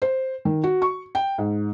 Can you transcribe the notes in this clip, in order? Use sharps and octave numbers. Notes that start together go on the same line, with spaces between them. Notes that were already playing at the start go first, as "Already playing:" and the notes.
C5
D#3
F#4
C#6
G5
G#2